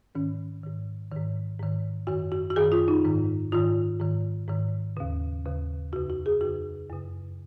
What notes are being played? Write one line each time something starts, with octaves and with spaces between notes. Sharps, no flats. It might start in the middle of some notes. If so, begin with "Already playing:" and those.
G#2 D#3 C#4
G#2 D#3
G#2 D#3
G#2 D#3
F#2 D#3 F#4
F#4
F#4
F#2 D#3 G#4
F4
D#4
G#2 D#3
G#2 D#3 F4
G#2 D#3
G#2 D#3
D#2 C#3
D#2 C#3
F2 C#3 F#4
F#4
G#4
F2 C#3 F#4
F#2 C#3